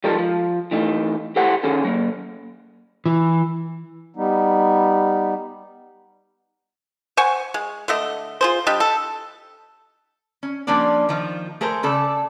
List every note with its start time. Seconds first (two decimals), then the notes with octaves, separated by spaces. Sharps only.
0.04 F3 G3 G#3 D#4 A4 A#4
0.19 F3
0.71 E3 A3 D#4
1.36 E4 G4 A4 C5 F#5
1.63 D#3 C#4 G#4 A4
1.85 F#3 A#3
3.06 E3
4.16 G3 B3 D#4
7.17 C5 F#5 G#5 C#6
7.54 G#3
7.88 D3 A3 D#5
8.41 F4 G#4 C5
8.66 G3 D4 D#5 G5
8.80 A4
10.43 C#4
10.67 F3 G3 A#3 C#4 D4 D5
11.09 D#3 F3
11.61 A3 G#4 A#4 C5
11.83 C#3 A4 D5